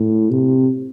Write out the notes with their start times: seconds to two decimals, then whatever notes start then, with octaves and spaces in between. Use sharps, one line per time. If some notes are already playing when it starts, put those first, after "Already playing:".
Already playing: A2
0.31 C3